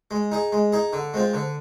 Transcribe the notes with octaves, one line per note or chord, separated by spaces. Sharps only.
G#3
D#4 G#4
G#3
D#4 G#4
D3
G#3 C4 F4
D3